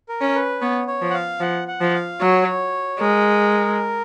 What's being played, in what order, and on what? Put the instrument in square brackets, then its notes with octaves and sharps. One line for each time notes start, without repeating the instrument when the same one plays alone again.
[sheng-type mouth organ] A#4
[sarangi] C#4
[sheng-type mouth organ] B4
[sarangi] B3 [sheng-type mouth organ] C#5
[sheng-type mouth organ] C#5
[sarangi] F3
[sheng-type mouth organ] F#5
F5
[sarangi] F3 [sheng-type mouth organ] F#5
[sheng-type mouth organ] F#5
[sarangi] F3
[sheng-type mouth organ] F5
[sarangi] F#3 [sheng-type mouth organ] C#5
[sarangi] G#3 [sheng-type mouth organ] A#4